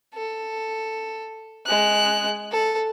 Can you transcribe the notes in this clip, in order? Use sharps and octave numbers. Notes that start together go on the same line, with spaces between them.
A4
G#3 F#6
A4